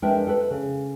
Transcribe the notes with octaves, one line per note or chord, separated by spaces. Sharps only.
G#3 D4 A#4 B4 E5 G5
A4 B4
C#3